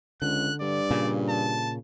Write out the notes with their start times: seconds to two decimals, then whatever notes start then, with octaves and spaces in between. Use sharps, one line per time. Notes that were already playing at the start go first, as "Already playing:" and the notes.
0.22 C#2 D3 F#6
0.61 G2 D5
0.90 A#2 C#3
1.29 A5